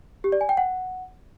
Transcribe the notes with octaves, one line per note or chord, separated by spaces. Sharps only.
G4
D5
G#5
G5
F#5